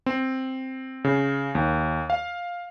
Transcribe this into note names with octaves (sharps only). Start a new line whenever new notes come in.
C4
C#3
D#2
F5